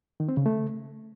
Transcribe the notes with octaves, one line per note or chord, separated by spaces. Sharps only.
D#3
C4
C#3
A3